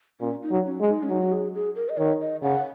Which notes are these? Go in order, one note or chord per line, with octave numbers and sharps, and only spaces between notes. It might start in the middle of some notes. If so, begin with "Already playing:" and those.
A#2 C#4
D#4
F#3
C#4
G#3
D#4
C#4
F#3 D#4
F#4
G#4
G#4
A#4
D#5
D#3 C#5
D#5
C#3 F#5